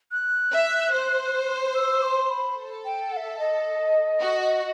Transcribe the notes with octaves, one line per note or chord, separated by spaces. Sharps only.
F#6
E5
C5
E6
C6
B5
A4
G5
F#5
E5
D#5
F#4